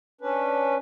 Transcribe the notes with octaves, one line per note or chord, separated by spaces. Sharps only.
C#4 D4 B4